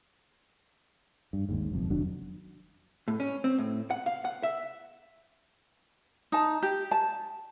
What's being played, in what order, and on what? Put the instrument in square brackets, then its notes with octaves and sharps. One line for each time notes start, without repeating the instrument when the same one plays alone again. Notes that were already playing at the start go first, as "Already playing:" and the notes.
[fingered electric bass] G2
G#1 D#2 G#2
F#1 B1 F2
F1 D#3 F#3 D4
[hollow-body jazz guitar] A2
C#4
C4
A2
F#5
F5
F#5
E5
[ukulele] D#4 A5
G4
A5